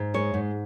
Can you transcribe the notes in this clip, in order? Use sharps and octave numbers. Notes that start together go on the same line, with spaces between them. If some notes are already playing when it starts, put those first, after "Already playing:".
Already playing: G#2
G#3 C#5
G#2